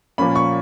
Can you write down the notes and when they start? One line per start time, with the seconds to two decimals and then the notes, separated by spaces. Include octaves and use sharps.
0.18 A#2 F3 A#3 C#4 B5
0.35 C#6